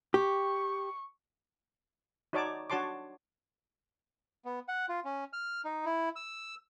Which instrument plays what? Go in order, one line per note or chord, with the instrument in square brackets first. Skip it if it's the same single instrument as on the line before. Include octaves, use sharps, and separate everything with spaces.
[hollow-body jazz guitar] G4 [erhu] C#6
[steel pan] D#4 F#4 C#5 D5 A5 D6
D4 F#4 C#5 A5 C6 D6
[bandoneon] B3
F#5
F4
C#4
F6
D#4
E4
E6